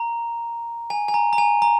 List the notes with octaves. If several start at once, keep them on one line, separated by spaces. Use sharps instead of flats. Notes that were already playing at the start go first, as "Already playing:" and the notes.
Already playing: A#5
G#5
G#5
A#5
A#5
G#5
A#5